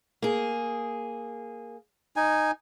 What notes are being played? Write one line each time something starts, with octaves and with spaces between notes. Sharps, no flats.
A#3 G#4
D#4 G#5